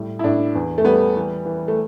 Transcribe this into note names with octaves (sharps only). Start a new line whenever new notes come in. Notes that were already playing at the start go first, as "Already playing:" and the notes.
Already playing: A2 G3
E4
A2 D4
E2
A3
G3 B3
E3
E3
A3